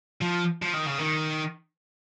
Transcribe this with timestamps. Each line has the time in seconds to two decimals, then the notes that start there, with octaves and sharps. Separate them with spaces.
0.22 F3
0.62 F3
0.74 D#3
0.87 C#3
0.99 D#3